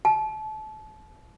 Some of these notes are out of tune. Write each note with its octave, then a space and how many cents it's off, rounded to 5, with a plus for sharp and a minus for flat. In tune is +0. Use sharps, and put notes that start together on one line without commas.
A5 -30